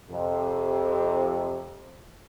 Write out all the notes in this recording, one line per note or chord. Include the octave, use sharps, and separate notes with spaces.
F2 C3